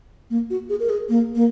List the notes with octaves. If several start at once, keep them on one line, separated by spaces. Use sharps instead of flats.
A#3
F#4
G#4
A#4
G#4
A#3
A#3